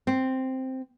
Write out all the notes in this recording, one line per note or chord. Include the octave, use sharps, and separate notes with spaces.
C4